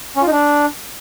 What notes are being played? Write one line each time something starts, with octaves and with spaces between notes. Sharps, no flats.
C#4
F4
D#4
D4